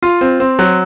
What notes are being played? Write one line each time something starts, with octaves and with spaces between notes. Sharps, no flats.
F4
C4
C4
F#3